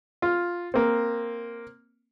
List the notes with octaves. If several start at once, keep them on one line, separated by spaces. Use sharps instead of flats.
F4
A#3 C4